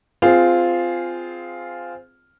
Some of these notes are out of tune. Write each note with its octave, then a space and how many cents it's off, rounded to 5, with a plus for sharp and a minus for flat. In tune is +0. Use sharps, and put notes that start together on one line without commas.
C4 -15 F4 +0 G#4 +0